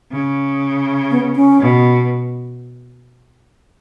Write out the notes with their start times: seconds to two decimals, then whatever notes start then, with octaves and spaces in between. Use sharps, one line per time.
0.12 C#3
1.11 B3
1.36 C#4
1.60 B2